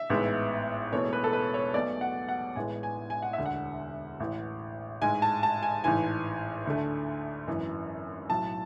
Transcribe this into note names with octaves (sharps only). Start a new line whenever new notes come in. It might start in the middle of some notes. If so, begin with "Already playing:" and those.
Already playing: E5
A1 G#2 G#3 B3
E1 E2 B2 A3 C#5
B4
A4
B4
C#5
B1 B2 A3 D5
F#5
F#5
A1 A2 G#3 B3 G#5
G#5
G#5
F#5
E1 D2 D3 E5
F#5
A1 A2 E3
A1 G#2 G#3 G#5
A5
A5
G#5
A1 G#2 E3 G#5
D2 D3 A3
G#1 F#2 E3
B1 A2 F#3 A5